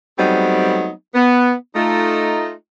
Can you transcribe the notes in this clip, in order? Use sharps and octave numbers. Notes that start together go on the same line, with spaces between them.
F#3 G3 A3 B3 C4 D#4
B3
A3 D#4 F4